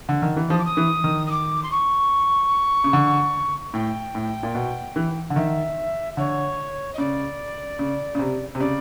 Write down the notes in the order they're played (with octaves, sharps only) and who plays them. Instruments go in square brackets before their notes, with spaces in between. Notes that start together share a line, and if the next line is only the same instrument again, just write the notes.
[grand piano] D3
D#3
E3
[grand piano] F3 [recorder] D#6
[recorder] D6
D#6
[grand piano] E3
D#3
[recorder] D#6
D6
C6
C#6
[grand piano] C#3
D3
[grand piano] A2 [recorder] G5
[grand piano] A2
A#2
B2
E3
D3
[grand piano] D#3 [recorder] E5
[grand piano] D3 [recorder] C#5
[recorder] D#5
[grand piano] C#3 [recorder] D5
[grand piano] C#3
C#3
C3
C3
[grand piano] C#3 [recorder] D5